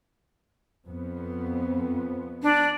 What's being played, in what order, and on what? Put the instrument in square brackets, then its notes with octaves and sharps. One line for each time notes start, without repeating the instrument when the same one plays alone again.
[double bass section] F2 B3
[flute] D4